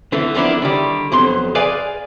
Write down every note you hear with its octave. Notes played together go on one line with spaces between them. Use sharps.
D3 E3 A3 B3
F3 A#3 B3 D4 E4
D3 D#3 G3
B1 F2 B2 C6
G#4 B4 D5 F5 G#5